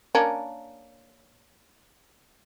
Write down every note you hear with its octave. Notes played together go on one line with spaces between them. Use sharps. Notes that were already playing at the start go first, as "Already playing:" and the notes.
A#3 C#4 D4